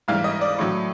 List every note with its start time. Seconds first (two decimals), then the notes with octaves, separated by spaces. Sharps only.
0.08 G#2 E3 G3 F5
0.24 D#5
0.41 D5
0.59 A2 F#3